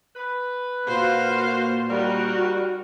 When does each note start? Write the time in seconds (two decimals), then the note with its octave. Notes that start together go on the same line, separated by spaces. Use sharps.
0.16 B4
0.87 A#2 A#3 F4 F#4 C5 F5
1.90 G3 D#4 F#4 A#4